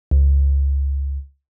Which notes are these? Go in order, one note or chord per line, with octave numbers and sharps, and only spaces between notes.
C#2